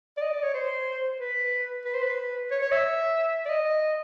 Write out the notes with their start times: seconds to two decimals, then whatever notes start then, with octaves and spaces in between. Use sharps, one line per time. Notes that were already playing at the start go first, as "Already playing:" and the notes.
0.17 D5
0.21 D#5
0.33 D5
0.42 C#5
0.54 C5
1.20 B4
1.85 B4
1.94 C5
2.03 B4
2.51 C#5
2.62 C#5
2.72 E5
3.45 D5
3.49 D#5